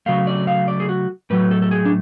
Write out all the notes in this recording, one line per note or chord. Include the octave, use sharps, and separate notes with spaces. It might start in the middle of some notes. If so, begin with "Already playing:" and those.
C#3 F#3 A3 F5
D5
F5
D5
G#4
F#4
A2 F#3 A3 B4
A4
A4
G#4
D4